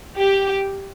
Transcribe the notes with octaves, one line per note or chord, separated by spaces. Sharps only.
G4